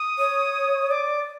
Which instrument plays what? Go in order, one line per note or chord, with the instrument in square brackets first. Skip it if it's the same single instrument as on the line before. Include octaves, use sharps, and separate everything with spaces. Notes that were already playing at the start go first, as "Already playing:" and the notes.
Already playing: [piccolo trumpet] D#6
[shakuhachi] C#5
[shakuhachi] D5 [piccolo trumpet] D6